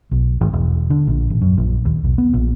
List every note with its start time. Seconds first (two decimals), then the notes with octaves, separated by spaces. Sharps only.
0.11 B1
0.41 G#1
0.53 E1
0.90 D3
1.07 A#1
1.30 A1
1.42 F#2
1.58 A#1
1.85 D#2
2.04 B1
2.18 B3
2.34 A#1